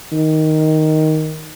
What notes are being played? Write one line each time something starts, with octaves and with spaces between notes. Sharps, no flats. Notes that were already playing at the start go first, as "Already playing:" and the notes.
D#3